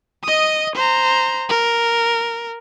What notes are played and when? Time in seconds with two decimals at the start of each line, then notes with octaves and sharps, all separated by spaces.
0.24 D#5 D#6
0.75 C5 A#5
1.49 A#4